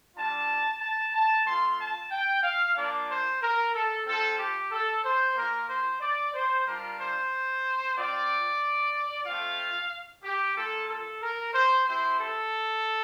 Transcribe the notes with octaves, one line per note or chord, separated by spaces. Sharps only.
G3 D4 F4 A5
A5
A5
A3 C4 F4 C6
A5
G5
F5
A#3 D4 F4 D5
C5
A#4
A4
C4 F4 A4
G4
A4
C5
A#3 F4 A#4
C5
D5
C5
G3 D4 F4 A#4
C5
C4 F4 D5
A3 C4 F4 F5
G4
A#3 F4 A4
A4
A#4
C5
C4 E4 G4 C5
A4